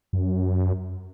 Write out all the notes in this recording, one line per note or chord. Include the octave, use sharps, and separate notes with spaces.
F#2